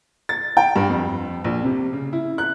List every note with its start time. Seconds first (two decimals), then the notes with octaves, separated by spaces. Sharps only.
0.29 A6
0.57 G5
0.76 G2
0.89 F2
1.44 A#1
1.63 C3
1.93 C#3
2.13 E4
2.38 F#6